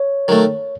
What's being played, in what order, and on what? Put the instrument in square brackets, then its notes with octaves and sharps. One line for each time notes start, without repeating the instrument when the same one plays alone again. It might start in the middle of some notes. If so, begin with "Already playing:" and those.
Already playing: [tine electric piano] C#5
[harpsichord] D#3 F#3 A3